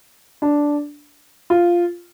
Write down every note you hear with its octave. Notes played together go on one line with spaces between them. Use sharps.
D4
F4